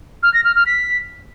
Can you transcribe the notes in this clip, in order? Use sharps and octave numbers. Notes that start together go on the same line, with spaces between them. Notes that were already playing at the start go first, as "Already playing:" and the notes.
F6
A#6
F6
F6
B6